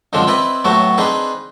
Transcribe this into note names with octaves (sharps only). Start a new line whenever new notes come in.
F#2 D3 F3 G#3 C4 D4
C4 E4 B4 D5 D#5
A2 F#3 A3 B3 F#4
C4 D4 D#4 G#4 B4